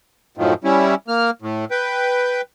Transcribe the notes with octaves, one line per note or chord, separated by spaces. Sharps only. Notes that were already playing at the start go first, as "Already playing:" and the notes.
F#2 A2 D#3 F3
G3 C#4 E4
A#3 F6
A2
B4 G5